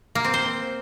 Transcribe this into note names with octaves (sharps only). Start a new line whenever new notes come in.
A#3
C4
C5